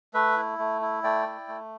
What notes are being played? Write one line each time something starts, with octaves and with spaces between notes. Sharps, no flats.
A3 B4 E5
E4
A3
E4
A3 D5 G5
E4
A3